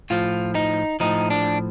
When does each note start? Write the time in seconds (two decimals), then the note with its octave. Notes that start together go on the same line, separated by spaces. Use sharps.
0.10 A2 F3 F4
0.55 D#4
1.00 A2 F3 D#4
1.30 D4